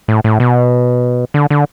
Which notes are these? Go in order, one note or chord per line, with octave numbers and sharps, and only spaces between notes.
A2
A2
B2
D3
D3